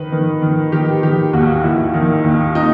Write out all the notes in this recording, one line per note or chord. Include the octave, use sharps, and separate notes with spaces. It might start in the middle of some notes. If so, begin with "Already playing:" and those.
Already playing: D#3 B4
D#3
D#3
D#3 G4
D#3 G4
D#2 F#4
D#2 E4
D#3
D#2
D#4